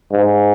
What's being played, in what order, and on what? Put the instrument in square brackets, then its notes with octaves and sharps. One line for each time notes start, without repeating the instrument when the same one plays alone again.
[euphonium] G#2